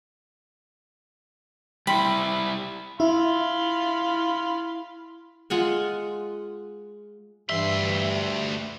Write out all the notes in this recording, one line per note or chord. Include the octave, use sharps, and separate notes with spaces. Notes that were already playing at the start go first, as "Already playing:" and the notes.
G3 E4 G5 B5 C6
E4 F5 B5 C6
G#3 F4 F#5 G#5
D2 G2 E3 G3 E5 C6